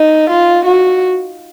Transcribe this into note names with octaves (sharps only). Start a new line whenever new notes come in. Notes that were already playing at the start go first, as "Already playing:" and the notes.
Already playing: D#4
F4
F#4